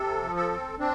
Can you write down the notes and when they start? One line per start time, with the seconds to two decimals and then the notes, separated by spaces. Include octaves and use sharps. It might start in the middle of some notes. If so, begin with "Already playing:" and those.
Already playing: C3 A4
0.22 F3
0.36 A4
0.51 C4
0.79 C4 D4